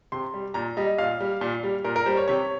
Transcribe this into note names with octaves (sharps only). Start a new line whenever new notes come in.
C3 C6
G3
A#2 A#5
G3 D#5
A#2 F5
G3
A#2
G3
A#2 A#4
A#4
G3 C5
C#5
C3 C#5